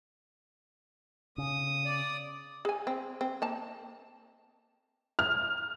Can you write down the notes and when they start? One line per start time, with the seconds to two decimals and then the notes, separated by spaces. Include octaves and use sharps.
1.38 C#3 D#6
1.85 D5
2.65 G#4 G#5
2.87 C4
3.21 C4
3.42 A#3 A5
5.19 F6